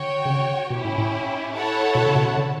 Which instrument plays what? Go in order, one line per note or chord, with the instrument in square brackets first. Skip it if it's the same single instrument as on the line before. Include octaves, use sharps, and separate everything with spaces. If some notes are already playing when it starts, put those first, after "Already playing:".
Already playing: [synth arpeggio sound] D3 [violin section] F#4 C#5 G5
[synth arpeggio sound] C#3
D3
[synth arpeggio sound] B2 [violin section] C#4 E4 G4
[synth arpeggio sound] A2
A2
[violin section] E4 A4 C#5 F#5 A5
[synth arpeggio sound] B2
C#3
B2
C#3
D3